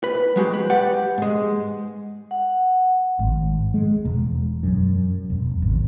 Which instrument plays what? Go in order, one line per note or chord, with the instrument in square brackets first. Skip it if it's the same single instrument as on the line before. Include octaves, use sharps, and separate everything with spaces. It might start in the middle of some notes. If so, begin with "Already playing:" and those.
[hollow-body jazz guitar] B4
F#3 G#3 F#4 G4
B4
G4 B4 D5 F#5
G#2 G#3
[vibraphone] F#5
[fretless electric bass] G#1
G#3
E1
F#2
E1
G#1